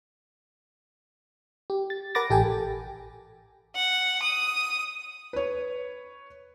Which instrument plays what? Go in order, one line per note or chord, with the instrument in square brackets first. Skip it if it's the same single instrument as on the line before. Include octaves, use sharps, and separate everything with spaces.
[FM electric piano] G4
A6
A#4 F#5 B5 D6 A6 A#6
A1 G4 A4 G5 G#5
[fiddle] F#5
D#6
[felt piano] B4 C#5